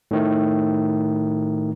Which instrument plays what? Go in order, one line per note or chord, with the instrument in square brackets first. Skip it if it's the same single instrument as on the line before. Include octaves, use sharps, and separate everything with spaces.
[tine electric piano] A2 D#3 A3